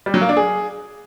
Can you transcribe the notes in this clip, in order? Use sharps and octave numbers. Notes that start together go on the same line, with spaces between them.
G3
F#3
A#3
D4
G#4